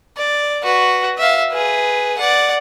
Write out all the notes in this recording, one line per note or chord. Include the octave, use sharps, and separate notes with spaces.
D5
F#4 B4
E5 F5
G#4 B4
D5 F#5